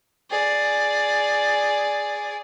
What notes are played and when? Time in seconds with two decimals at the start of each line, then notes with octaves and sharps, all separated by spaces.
0.31 G#4 D5